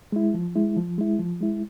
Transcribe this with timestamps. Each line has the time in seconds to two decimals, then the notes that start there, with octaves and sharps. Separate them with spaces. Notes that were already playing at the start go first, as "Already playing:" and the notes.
0.12 G#3 E4
0.34 F3
0.55 G#3 E4
0.77 F3
0.98 G#3 E4
1.19 F3
1.40 G#3 E4